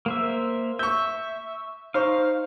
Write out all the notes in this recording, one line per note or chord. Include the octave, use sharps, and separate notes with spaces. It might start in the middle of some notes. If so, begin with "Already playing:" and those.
A#3 C5 E5
E5 C#6 G6
D#4 C5 F5 C#6